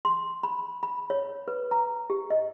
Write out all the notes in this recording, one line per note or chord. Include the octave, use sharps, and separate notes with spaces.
C6
B5
B5
C#5
B4
A#5
G4
D#5